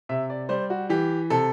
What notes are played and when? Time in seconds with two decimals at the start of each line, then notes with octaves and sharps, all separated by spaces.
0.09 C3 E5
0.30 D5
0.49 G3 C5
0.70 F#4
0.89 E3 G4
1.30 C3 A4